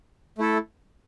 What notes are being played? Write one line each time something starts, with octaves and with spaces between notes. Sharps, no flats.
A3 E4 A4